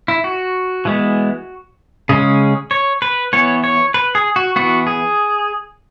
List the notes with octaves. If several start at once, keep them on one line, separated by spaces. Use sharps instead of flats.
E4
F#4
E3 G#3 B3
C#3 G#3 C#4 G#4
C#5
B4
E3 B3 C#5
C#5
B4
G#4
F#4
E3 B3 F#4
G#4